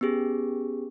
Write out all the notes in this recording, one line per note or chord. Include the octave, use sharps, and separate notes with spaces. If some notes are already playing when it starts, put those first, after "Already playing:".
B3 C#4 G4 G#4